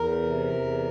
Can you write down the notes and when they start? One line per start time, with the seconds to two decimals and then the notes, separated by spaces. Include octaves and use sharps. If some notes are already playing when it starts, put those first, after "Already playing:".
Already playing: E2 A#4
0.22 C3
0.53 E2